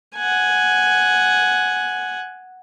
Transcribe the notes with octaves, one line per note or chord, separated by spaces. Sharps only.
F#5 G#5